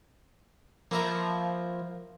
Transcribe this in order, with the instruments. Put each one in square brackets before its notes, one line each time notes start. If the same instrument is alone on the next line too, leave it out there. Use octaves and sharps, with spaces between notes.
[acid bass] F3 [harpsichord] A#3 E4 A#4